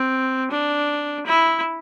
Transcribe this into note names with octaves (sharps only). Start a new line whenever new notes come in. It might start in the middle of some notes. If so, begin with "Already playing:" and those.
Already playing: C4
D4
E4